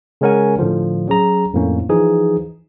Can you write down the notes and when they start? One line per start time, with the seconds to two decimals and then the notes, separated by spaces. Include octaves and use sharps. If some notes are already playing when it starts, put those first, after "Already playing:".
0.21 C#3 G#3 C#4 A#4 F#5 G#5
0.59 A2 D3 F3
1.08 F#3 C#4 G#4 A#5
1.54 F2 A2 A#3 C#4
1.89 E3 F3 D#4 G#4